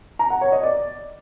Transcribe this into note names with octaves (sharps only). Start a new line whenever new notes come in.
A#5
F#5
C#5
D#5
D5